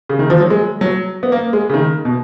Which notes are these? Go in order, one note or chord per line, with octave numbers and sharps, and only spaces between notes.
C#3
D#3
F3
F#3
G#3
F#3
B3
A#3
G#3
C#3
D#3
B2